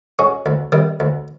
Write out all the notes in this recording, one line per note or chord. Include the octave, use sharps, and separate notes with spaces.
G#3 C#4 F#4
D2
C3 D#3 G3
D2